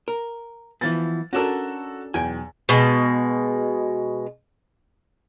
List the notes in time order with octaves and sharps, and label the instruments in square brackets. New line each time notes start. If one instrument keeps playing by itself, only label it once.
[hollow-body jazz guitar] A#4
[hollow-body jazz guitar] E3 F3 B3 [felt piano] A6
[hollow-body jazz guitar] C#4 D4 A#4 [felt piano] F#4 A4
[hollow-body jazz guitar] B1 G5 G#5 [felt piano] E2
[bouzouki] B2 G#3